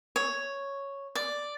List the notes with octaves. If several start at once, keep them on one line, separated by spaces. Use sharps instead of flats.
C#5
D5